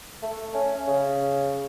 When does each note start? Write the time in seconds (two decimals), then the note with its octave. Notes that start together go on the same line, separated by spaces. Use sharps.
0.23 A3
0.54 C#4
0.88 C#3